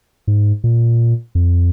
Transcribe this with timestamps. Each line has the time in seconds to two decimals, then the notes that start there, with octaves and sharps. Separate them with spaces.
0.27 G#2
0.64 A#2
1.35 F2